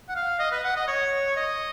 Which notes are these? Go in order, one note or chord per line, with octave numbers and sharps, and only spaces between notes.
F#5
F5
D#5
B4
F#5
D#5
C#5
D#5